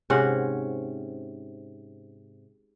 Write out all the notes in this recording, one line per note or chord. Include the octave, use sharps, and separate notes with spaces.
G#2 C3 C#4 F#5